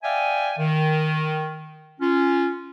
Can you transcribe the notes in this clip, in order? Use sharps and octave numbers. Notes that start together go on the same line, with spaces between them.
D5 E5 F5 G5 G#5
D#3
C#4 F4